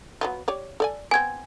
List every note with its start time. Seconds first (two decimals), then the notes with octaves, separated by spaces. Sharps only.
0.21 F#3 B3 F4
0.48 G4 C#5 D5
0.80 A4 D5 G#5
1.11 B3 C4 G#5 G#6